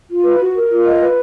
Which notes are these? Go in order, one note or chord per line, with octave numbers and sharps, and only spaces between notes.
F4
B4
F#4
A#4
F4
D#5
B4